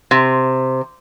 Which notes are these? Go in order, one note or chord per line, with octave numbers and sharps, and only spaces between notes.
C3